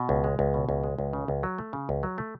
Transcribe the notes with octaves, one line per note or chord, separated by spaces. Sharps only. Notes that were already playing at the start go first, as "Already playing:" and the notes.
Already playing: B2
C#2
G#3
C#2
B2
C#2
G#3
C#2
C#3
C#2
F#3
A3
C#3
C#2
F#3
A3